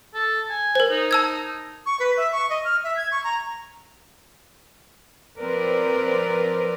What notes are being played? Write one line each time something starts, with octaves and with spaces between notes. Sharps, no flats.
A4
G#5
A#4 C5
D#4
A5 E6 G#6
C#6
B4
E5
C#6
D#5
F6
E5
G#6
C#6
A#5
F3 C4 A#4 B4 D5